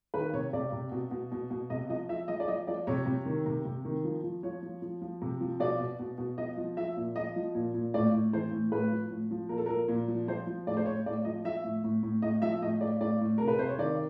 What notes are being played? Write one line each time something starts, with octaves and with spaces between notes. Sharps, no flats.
D#3 B4
C3 C#5
C3 D5
C3
B2
B2
B2
B2
C3 D#5
F3 D#5
F3 E5
F3 D#5
D5
F3 D#5
F3 D5
C3 C#5
C3
D#3
C3
C3
D#3
F3
F3
F3 C#5
F3
F3
F3
C3
F3
B2 D5
B2
B2
B2
F3 D#5
F3
F3 E5
A#2
F3 D#5
F3
A#2
A#2
A2 D5
A2
E3 C5
A2
A2 B4
F3
A2
F3
A#2 A#4
A4
F3 A#4
A#2
F3
F3 C5
F3
A2 D5
C5
A2 C#5
A2 D5
F3 D#5
F3 E5
A2
A2
A2
A2 D#5
F3 E5
A2 D#5
A2 D5
A2 D5
A2
C3 A#4
B4
C3 C5
C#5
D#3 D5